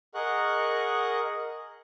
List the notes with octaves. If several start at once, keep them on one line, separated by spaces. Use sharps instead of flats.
G#4 A#4 D#5 F#5 C#6 F#6